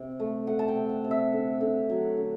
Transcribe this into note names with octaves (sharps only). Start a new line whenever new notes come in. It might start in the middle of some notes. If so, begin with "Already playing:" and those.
Already playing: C3
A3
A3 F#5
A5
G5
C3
F#5
C3
E5
D3
D3
F#3
D3